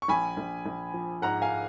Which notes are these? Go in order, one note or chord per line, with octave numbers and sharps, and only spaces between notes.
C#6
A#1 G#5 B5
A#1
A#1
F3
G#2 F#5 A#5
F5 G#5